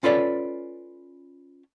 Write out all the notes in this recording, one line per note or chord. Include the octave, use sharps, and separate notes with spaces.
C#4 F4 A4 B4 C#5 D5